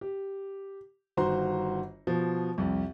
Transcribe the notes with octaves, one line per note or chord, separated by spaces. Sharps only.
G4
G1 D#3 F#4 C5 A#5 C6
B2 F3
C2 F2